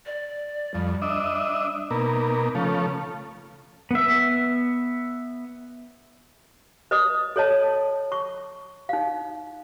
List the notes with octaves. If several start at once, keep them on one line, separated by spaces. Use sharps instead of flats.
D5
F2 G3
D4 D#5 E5
B2 A#3 D#4
C#3 F3 A3
B3 E5
B4 D#5 D#6
A4 C#5 D#5 A5
C#6
D#4 F5